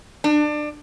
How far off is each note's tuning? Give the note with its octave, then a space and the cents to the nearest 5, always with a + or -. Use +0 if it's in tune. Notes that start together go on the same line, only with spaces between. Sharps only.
D4 +25